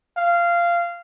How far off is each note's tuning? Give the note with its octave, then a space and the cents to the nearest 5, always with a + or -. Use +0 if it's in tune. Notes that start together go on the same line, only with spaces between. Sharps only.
F5 -15